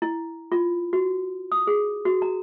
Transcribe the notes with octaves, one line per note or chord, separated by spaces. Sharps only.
E4
F4
F#4
D#6
G#4
F#4
A#5